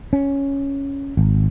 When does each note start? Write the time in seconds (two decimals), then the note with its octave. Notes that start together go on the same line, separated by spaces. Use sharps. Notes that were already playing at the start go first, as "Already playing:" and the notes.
0.13 C#4
1.17 G#1